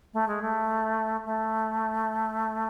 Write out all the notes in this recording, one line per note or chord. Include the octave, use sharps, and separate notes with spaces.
A3
G#3
A3
A3